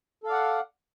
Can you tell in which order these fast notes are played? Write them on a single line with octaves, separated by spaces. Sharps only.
A4 F5 D5 F#5